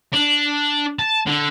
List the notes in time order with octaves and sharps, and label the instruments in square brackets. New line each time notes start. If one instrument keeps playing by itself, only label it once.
[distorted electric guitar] D4
A5
D3